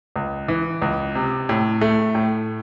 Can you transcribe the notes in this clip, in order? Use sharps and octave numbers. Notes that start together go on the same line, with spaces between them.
C#2
E3
C#2
C3
A2
A3
A2